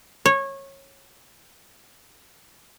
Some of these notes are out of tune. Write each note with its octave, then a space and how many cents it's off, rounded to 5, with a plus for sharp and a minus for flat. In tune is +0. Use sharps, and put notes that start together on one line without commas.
C#5 -20